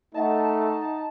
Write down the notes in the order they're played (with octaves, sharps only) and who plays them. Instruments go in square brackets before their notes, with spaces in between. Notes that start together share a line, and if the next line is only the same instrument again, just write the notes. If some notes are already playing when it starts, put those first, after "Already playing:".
[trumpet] A3 [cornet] D#4 [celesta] D#5 E5 F#5 [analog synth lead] A5